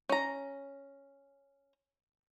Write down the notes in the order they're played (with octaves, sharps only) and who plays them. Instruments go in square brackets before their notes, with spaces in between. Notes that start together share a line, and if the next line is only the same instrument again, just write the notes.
[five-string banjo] C#4 A#5